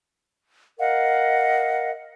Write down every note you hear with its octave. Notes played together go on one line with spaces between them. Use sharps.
A#4 D#5 F5 F#5